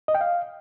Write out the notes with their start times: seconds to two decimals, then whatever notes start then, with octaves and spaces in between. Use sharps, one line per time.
0.08 D#5
0.15 G5
0.21 F5